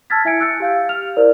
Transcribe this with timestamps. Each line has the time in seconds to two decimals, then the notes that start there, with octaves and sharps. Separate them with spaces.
0.10 A5 E6 F6 G#6 A6 B6
0.25 E4 E5 G#5 G#6 C#7 D7
0.40 E6 F#6 G6 A6 C#7
0.60 G4 F5 G6
0.89 F6 F7
1.16 E4 A#4 C5 D5